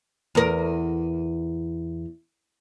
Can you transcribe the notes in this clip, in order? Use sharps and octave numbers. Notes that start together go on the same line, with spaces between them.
E2 A#4